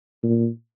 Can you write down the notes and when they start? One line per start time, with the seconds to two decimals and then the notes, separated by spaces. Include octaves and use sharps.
0.23 A#2